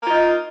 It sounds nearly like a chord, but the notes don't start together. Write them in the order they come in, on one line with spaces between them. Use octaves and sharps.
A#3 F4 D#4